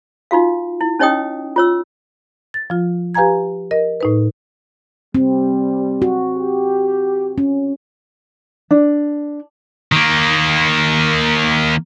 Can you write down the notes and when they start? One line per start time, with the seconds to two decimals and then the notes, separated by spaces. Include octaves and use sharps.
0.31 D#4 F4 F#4 F5
0.81 E4
0.99 C#4 D#4 C#5 D#5 G5 D#6
1.56 F4 C#5 E6
2.54 A6
2.70 F3 F4
3.15 G4 B4 F5 G#5 A#5 G#6
3.71 A#4 D#5
4.01 A2 D#4 B4
5.15 G3 C4
6.02 F#4
6.37 G4
7.38 C#4
8.71 D4
9.92 D#3 A#3